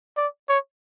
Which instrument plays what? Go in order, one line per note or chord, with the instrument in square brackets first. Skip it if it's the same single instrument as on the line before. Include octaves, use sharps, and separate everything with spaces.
[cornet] D5
C#5